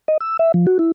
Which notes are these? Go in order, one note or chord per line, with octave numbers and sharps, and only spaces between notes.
D#5
E6
E5
F3
F#4
E4